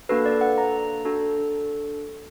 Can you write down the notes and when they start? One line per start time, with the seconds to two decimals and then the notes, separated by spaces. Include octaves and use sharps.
0.09 A#3 D4 F#4 A4 B4
0.26 D5
0.41 F#5
0.58 A#5
1.05 D4 F#4 A4